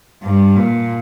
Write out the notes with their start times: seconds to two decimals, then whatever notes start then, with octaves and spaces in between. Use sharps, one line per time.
0.23 G2
0.56 A#2